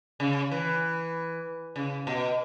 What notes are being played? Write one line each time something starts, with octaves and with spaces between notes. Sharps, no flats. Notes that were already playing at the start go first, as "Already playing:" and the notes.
C#3
E3
C#3
B2